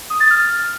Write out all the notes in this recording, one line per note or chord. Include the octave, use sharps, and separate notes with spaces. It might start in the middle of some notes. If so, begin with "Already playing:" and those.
D#6
A6
F6